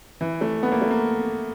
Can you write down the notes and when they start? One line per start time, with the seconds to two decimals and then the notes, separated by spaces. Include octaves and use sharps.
0.21 E3
0.41 A3
0.63 B3
0.72 A#3
0.82 A3
0.91 A#3